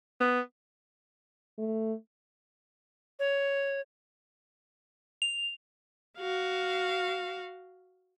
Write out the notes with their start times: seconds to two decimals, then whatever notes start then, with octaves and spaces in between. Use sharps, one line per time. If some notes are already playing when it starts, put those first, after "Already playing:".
0.20 B3
1.59 A3
3.19 C#5
5.22 F7
6.19 F#4 F5